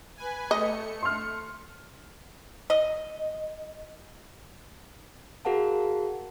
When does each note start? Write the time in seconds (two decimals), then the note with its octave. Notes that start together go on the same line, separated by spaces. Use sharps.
0.17 B4 G#5
0.51 A3 D#5 C#7
1.03 C6 F6
2.70 D#5
5.45 F#4 G#4 A#4 F5 F#5 A5